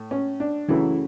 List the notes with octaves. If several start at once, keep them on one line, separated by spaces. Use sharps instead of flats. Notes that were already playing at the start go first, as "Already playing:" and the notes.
Already playing: A2
C#4
D4
F#2 C#3 E3 F#3 A3 E4